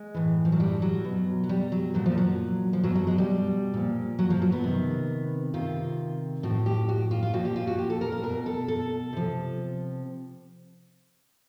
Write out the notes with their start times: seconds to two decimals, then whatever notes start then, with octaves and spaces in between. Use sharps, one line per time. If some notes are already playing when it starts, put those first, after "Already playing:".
Already playing: G#3
0.14 A2 E3
0.45 F3
0.52 F#3
0.60 G3
0.82 F#3
1.05 B2
1.44 F#3
1.49 G3
1.72 F#3
1.94 A#2 F3 F#3
2.06 F3
2.18 F#3
2.73 F3
2.84 B2 F#3
2.95 F#3
3.07 G#3
3.18 G3
3.74 A#2 F3
4.19 F#3
4.30 F3
4.42 F#3
4.52 B3
4.64 C3 D#3
5.54 C3 D#3 F4
6.43 A2 F3 F#4
6.66 G4
6.89 F#4
7.11 F4
7.23 F4
7.33 A#2 F3 F#4
7.45 G4
7.56 F4
7.67 F#4
7.79 G4
7.90 A4
8.01 A#4
8.12 A#4
8.23 B2 A#4
8.46 A4
8.68 A4
9.13 C3 F3